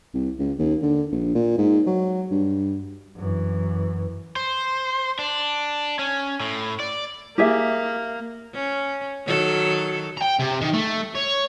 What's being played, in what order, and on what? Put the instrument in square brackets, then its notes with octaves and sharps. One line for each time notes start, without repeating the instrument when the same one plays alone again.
[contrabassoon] C2
C#2
D#2
D3
A#1
A#2
G#2
F#3
G2
[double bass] F#2 E3
[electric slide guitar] C5
D4
C#4
A2
D5
[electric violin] A#3 [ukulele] G4 G#4 E5
[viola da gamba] C#4
D#3 F#3 A4
[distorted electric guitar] G5 A#5
C3
D#3
A3
C#5